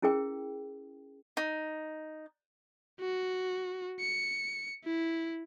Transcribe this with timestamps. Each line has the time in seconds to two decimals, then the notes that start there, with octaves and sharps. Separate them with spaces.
0.02 C#4 E4 G#4 A#4 G5
1.37 D#4
3.00 F#4
4.00 C#7
4.84 E4